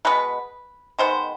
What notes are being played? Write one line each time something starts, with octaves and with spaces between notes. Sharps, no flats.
B2 G#3 B3 B4
D#3 G#3 B3 C5